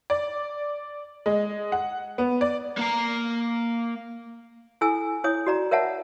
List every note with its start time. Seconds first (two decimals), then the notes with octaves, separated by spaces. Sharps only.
0.10 D5
1.26 G#3
1.72 F#5
2.18 B3
2.41 D5
2.78 A#3 A#5
4.81 E4 A4 G#5 E6
5.24 E4 C#5 D#6
5.47 F#4 D5 A#5
5.71 A#4 C#5 E5 F#5 A5